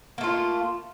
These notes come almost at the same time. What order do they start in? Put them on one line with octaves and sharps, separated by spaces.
A#3 A3 F4